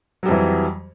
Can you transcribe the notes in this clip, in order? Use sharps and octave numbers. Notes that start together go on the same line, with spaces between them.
F2 E3 F#3 G3